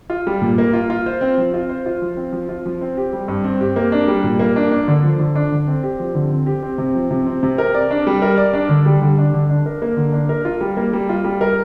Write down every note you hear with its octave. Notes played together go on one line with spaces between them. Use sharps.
F4
G3
A#2
A#3
F4
F4
C5
C4
F3
F4
C5
F4
F3
C4
F3
F4
F3
C4
G4
G3
G2
C4
G4
A#3
D4
G3
A#2
A#3
D4
D4
D3
F3
D3
D4
D3
C4
G4
F3
D3
C4
G4
C4
C3
F3
C3
C4
C3
A#4
D5
D4
G3
A#4
D5
D4
D3
G3
D3
D4
D3
D4
A#4
A#3
D3
D4
A#4
F4
G3
A#3
G3
F4
G3
A#4